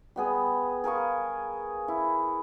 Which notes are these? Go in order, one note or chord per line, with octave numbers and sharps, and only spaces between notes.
G3 B3 G#4
G#4 A#4 F5 C#6
E4